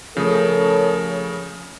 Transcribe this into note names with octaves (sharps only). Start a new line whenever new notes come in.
C#3 F3 A3 A4 A#4 C#5 D#6